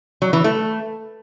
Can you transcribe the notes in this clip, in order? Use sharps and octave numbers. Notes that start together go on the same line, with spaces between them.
F#3
E3
A3